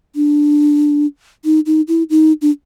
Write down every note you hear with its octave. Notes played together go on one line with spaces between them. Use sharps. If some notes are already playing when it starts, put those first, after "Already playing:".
D4
D#4
D#4
E4
D#4
D4